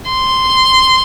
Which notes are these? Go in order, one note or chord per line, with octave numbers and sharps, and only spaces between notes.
C6